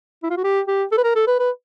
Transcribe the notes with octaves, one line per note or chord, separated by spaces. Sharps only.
E4
F4
F#4
G4
G4
A4
B4
A#4
A4
B4
B4